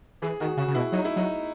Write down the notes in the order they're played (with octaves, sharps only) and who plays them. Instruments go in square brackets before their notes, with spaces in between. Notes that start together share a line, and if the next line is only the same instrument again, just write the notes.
[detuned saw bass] E3 [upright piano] G#4
[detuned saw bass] D#3 [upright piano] F#4
[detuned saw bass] C#3 [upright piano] F#4
[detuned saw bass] C#3
[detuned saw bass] B2 [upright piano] E4
[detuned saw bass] F#3 [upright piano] D#4
[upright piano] E4
[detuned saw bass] F#3 [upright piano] D#4